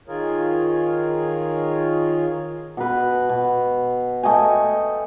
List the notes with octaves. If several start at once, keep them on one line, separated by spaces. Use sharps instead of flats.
D#3 F4 G#4 A#4 C#5
B2 B4
B2
A3 D#5 G5 G#5